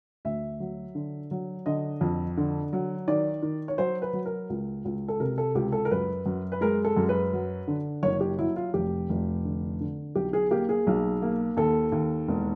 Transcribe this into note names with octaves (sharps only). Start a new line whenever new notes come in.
D2 E5
F#3
D3
F#3
D3 D#5
F2
D3
F#3
D#3 D5
D#3
C#5
F#3 C5
B4
F#3
A#4
C#2
C#2
A4
C3 A#4
A4
C#2 G4
A4
A#4
F#2 B4
F#2
B4
G#3 A#4
A4
F#2
B4
F#3
D3
F#1 C#5
G4
F#3 E4
F4
F1 G4
F1
D3
D3
B1 G4
G#4
A#3 G4
G#4
B1
A#3
D#2 A4
D#2
E1